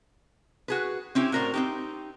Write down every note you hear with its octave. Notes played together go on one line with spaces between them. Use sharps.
F#4 G#4 B4
C4 C#4 E4 G4
A2 F#4 A#4 C5 D5
C4 D#4 G4